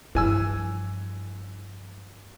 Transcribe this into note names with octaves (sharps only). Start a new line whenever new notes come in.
G2 E3 F3 G#5 E6